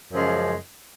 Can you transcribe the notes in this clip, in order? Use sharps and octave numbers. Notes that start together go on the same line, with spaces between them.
F#2 C#3 F3 G#3